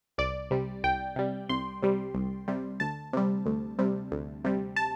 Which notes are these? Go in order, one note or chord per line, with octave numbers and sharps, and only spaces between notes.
C2 D5
C3 G3
C2 G5
C3 G3
C2 C6
C3 G3
C2
C3 G3
D2 A5
C3 G3
D2
C3 G3
D2
C3 G3
A5